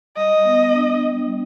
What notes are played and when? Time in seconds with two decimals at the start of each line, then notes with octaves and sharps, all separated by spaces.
0.17 G3 D#5
0.45 B3
0.74 D4
1.04 G3